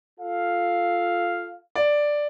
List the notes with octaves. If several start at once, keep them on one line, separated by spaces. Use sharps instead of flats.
F4 A4 F5
D5